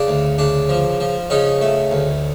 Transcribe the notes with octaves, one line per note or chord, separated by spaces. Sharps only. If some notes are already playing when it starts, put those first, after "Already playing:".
Already playing: C#3 D4
D2
C#3 D4
F3
F3
C#3 C#4 D#4
A3
D2